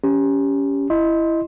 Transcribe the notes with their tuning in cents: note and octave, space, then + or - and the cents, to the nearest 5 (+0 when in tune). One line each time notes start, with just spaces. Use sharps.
C#4 +15 G4 +5
E4 +10 D#5 +0 C6 +0